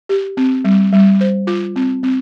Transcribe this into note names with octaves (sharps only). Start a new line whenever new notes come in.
G4
C4
G3
G3
C5
F4
C4
C4